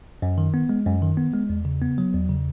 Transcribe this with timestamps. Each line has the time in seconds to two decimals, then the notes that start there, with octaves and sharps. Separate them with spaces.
0.22 F#2
0.38 D#3
0.54 B3
0.69 G#3
0.86 F#2
1.02 D#3
1.17 B3
1.34 G#3
1.50 E2
1.65 C#3
1.81 B3
1.98 F#3
2.14 E2
2.29 C#3